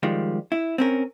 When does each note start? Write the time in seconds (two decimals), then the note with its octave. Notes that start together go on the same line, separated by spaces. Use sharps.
0.03 D#3 F3 G3 G#3
0.52 E4
0.78 C4 C#4 A#4